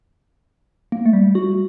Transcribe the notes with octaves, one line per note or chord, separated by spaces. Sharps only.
A#3
A3
G3
F#4